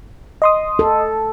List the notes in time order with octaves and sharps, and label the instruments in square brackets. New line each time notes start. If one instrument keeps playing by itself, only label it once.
[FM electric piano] D#5 C6 D#6
[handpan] A4